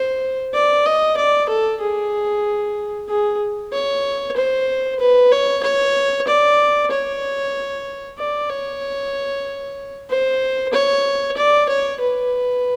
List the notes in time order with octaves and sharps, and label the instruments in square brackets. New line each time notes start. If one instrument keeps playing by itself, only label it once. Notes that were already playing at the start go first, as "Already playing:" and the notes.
Already playing: [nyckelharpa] C5
D5
D#5
D5
A4
G#4
G#4
C#5
C5
B4
C#5
C#5
D5
C#5
D5
C#5
C5
C#5
D5
C#5
B4